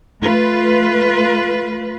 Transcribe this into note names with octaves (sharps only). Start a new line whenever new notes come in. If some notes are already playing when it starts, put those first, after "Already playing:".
A3 F4 B4